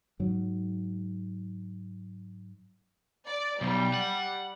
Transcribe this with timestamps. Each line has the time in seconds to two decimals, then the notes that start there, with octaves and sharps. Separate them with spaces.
0.19 G#2 F#3
3.27 D5
3.61 B1 G3
3.94 F#5